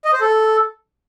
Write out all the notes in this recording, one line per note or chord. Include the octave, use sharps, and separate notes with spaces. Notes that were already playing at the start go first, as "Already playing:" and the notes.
D#5
C5
A4